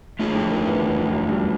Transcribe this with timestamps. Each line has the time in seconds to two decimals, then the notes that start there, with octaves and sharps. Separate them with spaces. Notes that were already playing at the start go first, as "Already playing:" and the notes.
0.19 A3 D4 F4 G#4
0.35 F2 F3
0.50 D#3
0.66 E2 E3
0.81 E2 E3
0.97 F2 F3
1.13 F#2 F#3
1.28 G2 G3